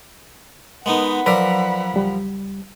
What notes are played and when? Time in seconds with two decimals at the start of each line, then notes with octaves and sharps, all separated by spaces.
0.86 G#3 B3 D#4 A#4 F#5 B5
1.26 F3 F#3 A#4 B4 D5 B6 D7
1.94 C#2 G3